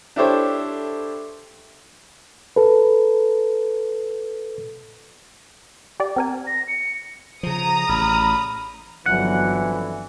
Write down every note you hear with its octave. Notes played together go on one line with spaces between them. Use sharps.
D4 E4 G4 A4 C5 C#5
A4 B4
G4 D5
C4 A#4 G#5
A#6
C#7
C#3 F3 A#5 D#6
A1 B5 F6
G1 F2 D3 E3 F#3 F#5